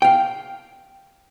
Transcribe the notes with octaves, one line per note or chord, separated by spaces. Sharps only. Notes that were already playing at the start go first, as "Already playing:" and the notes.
F5 G5